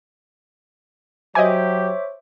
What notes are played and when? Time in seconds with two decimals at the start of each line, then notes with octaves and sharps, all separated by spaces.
1.35 F#3 G4 C5 C#5 D#5 E5 G#5 D6